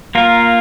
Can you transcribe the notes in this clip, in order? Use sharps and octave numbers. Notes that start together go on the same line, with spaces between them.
A#3 F4 A#4